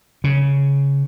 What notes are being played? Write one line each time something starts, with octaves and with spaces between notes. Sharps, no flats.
C#3